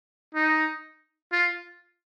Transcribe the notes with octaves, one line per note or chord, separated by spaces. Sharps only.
D#4
F4